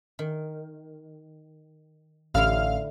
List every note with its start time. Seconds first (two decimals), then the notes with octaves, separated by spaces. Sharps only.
0.19 D#3
2.34 A1 D3 E4 F5 F6